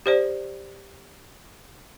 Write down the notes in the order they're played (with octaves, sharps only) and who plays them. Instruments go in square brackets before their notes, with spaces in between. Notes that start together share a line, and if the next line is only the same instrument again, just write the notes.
[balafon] G4 C5 D5